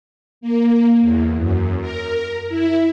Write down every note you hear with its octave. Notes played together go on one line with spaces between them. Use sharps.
A#3
E2
F#2
A#4
E4